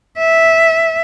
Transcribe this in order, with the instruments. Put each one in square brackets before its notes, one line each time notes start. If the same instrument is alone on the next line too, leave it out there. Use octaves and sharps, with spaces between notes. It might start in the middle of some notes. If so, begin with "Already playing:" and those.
[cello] E5